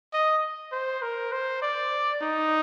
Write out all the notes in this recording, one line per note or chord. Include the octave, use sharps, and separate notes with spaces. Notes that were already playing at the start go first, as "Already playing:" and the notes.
D#5
C5
A#4
C5
D5
D#4